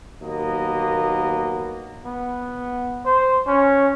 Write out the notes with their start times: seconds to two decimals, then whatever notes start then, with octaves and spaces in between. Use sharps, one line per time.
0.22 D#2 F#3 A#3 B3 D#5
2.05 B3
3.05 C5
3.47 C#4